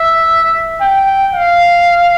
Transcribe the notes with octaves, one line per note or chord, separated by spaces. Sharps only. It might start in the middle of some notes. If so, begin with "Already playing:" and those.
Already playing: E5
G5
F5